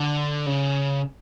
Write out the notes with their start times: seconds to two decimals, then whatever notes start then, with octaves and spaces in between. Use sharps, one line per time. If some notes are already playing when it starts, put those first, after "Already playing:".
Already playing: D3
0.46 C#3